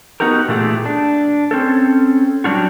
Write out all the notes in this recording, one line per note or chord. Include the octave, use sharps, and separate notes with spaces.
B3 D#4 F#4 G4 A#4
A#2 E3 A3 G4 G#4
D4
C4 C#4 A4
F#3 G3 D4 F4 F#4